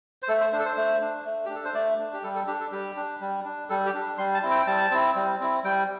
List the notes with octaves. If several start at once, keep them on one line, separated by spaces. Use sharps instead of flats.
C5
A3 A4
C5
D4 C5
A4
C5
A3
D4
A3
D4 G4
A4
C5
A3 D5
D4
G4
G3 A4
A4
D4 G4
A4
G3 G4
D4
G3
D4
G3 A4
G4
D4
G3 C6
A5
C4 E4
G5
G5
G3 A5
C4 E4
G3
C4 E4
G3 G5